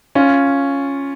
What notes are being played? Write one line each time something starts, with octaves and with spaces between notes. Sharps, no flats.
C#4 F4